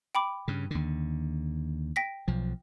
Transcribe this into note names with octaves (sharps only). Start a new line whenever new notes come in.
G5 B5 D6
G2 C#3
D#2 D3
G5 A#6 B6
B1 F3